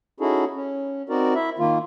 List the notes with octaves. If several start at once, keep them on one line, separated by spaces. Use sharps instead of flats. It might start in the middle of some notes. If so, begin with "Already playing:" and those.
C#4 D#4 E4 F#4 G#4 A4
C#4
C4 D#4 F#4 A#4 D5
E4 E5
D#3 A#3 F4